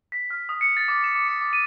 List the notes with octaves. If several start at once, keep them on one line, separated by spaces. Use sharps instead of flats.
B6
F6
D#6
C#7
A6
D6
E7
D6
C#7
D6
D#7